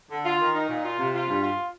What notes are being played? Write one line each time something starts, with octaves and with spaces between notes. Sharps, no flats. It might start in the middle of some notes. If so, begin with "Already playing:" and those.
D3
F4
D#3
D#4
A#2
F4
C3
F4
G2
F4